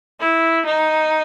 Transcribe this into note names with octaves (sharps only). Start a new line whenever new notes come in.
E4
D#4